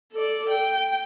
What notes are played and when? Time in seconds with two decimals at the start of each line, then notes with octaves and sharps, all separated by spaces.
0.13 A4 D5
0.50 G5